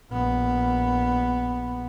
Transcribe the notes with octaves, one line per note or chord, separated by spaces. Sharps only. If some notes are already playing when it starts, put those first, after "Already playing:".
A#1 B3